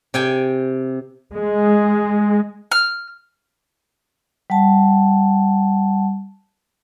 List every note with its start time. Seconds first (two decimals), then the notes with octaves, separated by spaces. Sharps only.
0.14 C3 G5 G#5
1.35 G#3
2.71 F6
4.50 G3 F#5 A5